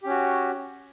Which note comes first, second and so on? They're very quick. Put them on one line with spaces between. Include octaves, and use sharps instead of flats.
G4 C#4 F#4